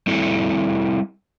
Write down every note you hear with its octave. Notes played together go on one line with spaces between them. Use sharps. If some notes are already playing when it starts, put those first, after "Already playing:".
G3 C4 E4 A4